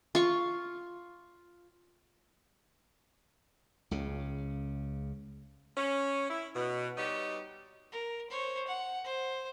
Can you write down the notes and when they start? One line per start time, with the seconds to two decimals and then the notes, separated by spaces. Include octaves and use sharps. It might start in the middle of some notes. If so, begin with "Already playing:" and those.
0.15 F4 C#6
3.91 C#2 C#3
5.77 C#4
6.30 E4
6.55 B2
6.97 G3 B3 D#4 G4 C#5
7.92 A#4
8.30 C5 C#5
8.67 F#5
9.04 C5